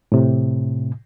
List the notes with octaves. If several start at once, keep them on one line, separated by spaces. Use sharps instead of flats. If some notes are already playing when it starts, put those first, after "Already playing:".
A2 C3